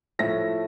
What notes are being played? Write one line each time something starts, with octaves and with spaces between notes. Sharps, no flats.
A2 F3 A3 A#6